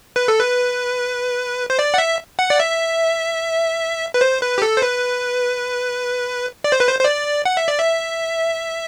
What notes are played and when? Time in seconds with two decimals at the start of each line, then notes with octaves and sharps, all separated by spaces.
0.16 B4
0.28 A4
0.40 B4
1.70 C5
1.79 D5
1.94 F#5
1.98 E5
2.39 F#5
2.50 D5
2.60 E5
4.14 B4
4.21 C5
4.42 B4
4.58 G4
4.62 A4
4.77 C5
4.82 B4
6.64 D5
6.72 C5
6.80 B4
6.88 C5
7.00 C5
7.04 D5
7.45 F#5
7.57 E5
7.68 D5
7.79 E5